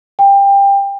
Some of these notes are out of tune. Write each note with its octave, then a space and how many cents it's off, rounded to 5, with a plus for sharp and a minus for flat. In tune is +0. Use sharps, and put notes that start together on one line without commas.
G5 +25